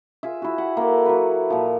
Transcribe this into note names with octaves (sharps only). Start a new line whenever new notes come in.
F4 G#4 E5
E4 F#4
F#5
A#3 A4 D5
F#3 B4
A#2 F3